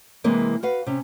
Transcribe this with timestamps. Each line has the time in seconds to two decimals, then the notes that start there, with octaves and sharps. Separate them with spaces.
0.24 C3 E3 G#3 A#3 C4
0.63 F#4 B4 F5
0.86 C3 C#4